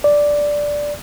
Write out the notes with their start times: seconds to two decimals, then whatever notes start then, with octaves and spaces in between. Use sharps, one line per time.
0.04 D5